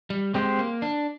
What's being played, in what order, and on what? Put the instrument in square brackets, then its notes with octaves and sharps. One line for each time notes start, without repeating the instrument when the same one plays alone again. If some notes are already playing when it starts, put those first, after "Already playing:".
[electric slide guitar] G3
[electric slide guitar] G#3 [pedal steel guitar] C4 G4 C5
[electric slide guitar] A#3
D4